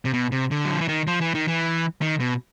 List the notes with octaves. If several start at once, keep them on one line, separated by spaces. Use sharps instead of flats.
C3
B2
C3
D3
F#3
F3
E3
D#3
F3
E3
D#3
E3
D#3
B2